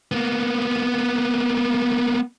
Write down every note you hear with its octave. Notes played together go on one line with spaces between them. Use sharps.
A#3 B3